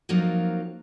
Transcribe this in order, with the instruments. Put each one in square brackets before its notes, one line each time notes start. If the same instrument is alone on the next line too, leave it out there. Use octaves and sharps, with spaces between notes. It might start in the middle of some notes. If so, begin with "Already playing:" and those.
[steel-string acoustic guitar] F3 F#3 A#3 C4 D#4 F4